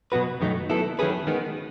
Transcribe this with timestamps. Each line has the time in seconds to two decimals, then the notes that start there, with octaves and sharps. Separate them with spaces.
0.12 B2 F#3 B3 F#4 B4
0.41 F#2 D#3 F#3 A3 D#4
0.70 F#3 B3 E4 A4
0.99 D#3 F#3 C#4 G#4 B4
1.27 D#3 G#3 B3